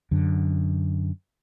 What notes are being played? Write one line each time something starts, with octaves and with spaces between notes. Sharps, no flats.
F#2 D3